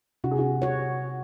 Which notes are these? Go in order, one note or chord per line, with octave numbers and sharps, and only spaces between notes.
C3 F#4
G#4
F#4
F#4 C#5